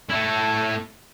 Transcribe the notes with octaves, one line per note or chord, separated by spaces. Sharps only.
A3 E4